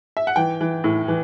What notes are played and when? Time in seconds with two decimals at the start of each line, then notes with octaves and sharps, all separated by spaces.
0.17 E5
0.27 F#5
0.36 E3 G5
0.61 E3
0.84 A2
1.08 E3